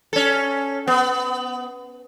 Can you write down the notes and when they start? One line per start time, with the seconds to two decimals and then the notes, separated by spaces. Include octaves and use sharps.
0.13 C#4 A4
0.87 B3